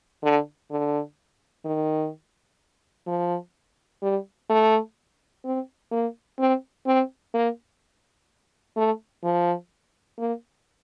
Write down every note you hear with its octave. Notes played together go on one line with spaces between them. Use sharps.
D3
D3
D#3
F3
G3
A3
C4
A#3
C4
C4
A#3
A3
F3
A#3